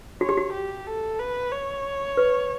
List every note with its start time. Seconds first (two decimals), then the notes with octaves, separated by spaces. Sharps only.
0.21 F#4 C#5
0.29 G4
0.37 F#4
0.53 G4
0.87 A4
1.20 B4
1.52 C#5
2.17 B4